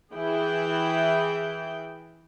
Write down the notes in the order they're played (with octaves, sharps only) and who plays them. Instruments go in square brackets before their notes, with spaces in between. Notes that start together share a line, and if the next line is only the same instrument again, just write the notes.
[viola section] E3 E4 G#4 E5 G5